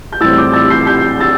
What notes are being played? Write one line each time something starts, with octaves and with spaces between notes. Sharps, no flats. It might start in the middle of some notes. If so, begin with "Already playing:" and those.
G6
A2 E3 G3 C4 E6 A6
D6 G6
E6 A6
G6 C7
G6 C7
E6 A6